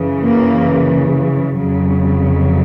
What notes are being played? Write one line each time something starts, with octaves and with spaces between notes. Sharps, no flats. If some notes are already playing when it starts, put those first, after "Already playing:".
Already playing: F#2 C#3 E3
A#3
F2 C#3 F#3